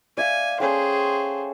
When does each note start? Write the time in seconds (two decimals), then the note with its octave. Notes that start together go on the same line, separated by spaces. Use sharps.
0.18 D5 E5 F5 G#5
0.60 C#4 G#4 A4 C5 G5